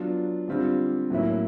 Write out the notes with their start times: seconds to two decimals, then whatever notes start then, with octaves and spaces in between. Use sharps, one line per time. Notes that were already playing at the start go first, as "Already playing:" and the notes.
Already playing: F#3 B3 D4 F4
0.48 D3 G3 C4 F4
1.10 A2 F#3 A#3 C#4 E4